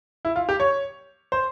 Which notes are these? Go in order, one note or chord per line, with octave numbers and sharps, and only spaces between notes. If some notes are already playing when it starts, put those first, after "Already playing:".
E4
F4
G4
C#5
C5